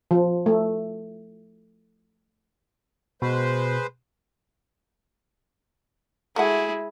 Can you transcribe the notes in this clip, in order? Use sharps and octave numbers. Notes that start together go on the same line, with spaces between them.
F3
A3
B2 G#3 B4 C5
G#3 A3 E4 F#4 G#4 F#5